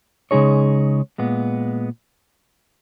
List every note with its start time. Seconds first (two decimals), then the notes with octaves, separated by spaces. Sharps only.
0.31 C#3 G#3 D#4 G#4 C#5
1.18 A#2 G#3 B3